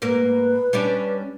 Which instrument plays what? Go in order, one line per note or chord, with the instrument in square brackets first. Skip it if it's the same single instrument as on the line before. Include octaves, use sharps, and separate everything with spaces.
[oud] G#2 A#3 A#4 [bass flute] B4
[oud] G3 C#4 D4